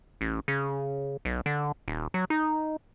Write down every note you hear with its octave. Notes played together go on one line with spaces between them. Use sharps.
A1
C#3
B1
D3
D#1
F#3
D#4